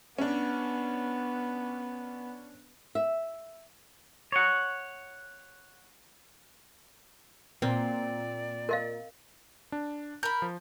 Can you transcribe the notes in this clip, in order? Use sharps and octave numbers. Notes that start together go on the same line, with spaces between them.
B3 C#4 D4
E5
C#5 F#5
A#2 C4 D5
A#4 D#5 F5
D4
A#4 B5 G6
F3